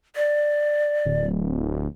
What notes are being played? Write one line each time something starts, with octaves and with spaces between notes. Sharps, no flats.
D5
D1